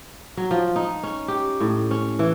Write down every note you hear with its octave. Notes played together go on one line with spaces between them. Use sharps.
F#3
F3
D#4
C#4
G4
A2
C#4
E3